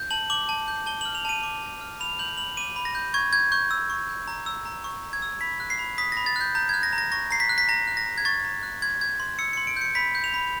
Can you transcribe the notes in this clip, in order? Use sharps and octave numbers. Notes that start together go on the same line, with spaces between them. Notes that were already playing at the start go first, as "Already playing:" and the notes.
Already playing: G6
A5 F#7
D6 F#7
A5
G6
A5 G7
F6 F#7
F7
A5 D#7
D6
A5
F6
B5 F7
G6 F#7
B5 F#7
D6 D#7
B5
A#6
G6
C#6 G#6
G6 G#6
C#6 G6
E6
C#6
G6
A#5
E6
A#5
C#6
A#5
G#6
E6
B5 B6
F#6
C7
B5
D#6 B6
B5 A#6
A6
F#6 G6
A#5 G6
F#6 G#6
A#6
A#5
A#6
C#6 A#6
A#5 C7
B6
F#6
B6
A#5 A#6
F#6
A#6
A#5
G#6
C#6 A6
A#5
F#6
C6 G#6
G6 G#6
C6
E6 C#7
C6 C#7
D7
G6 C#7
B5 B6
G6
F7
B5